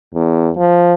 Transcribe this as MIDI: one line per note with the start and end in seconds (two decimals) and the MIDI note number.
0.14 0.51 40
0.57 0.94 53